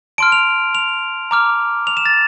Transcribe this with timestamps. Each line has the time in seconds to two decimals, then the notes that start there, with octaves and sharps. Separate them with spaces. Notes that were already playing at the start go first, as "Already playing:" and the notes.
0.18 A5 C6 F6 D7
0.32 F7
0.75 F7
1.31 A#5 D6 F6
1.87 F7
1.97 E7
2.06 A6